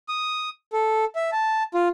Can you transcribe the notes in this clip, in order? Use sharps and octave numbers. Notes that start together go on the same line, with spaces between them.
D#6
A4
E5
A5
F4